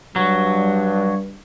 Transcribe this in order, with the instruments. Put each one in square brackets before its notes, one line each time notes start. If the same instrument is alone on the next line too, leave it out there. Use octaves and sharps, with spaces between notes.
[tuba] G2 [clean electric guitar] F#3 [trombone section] G3